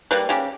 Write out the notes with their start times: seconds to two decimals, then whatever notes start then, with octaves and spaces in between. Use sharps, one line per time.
0.11 G3 A#3 B4
0.29 C#3 G4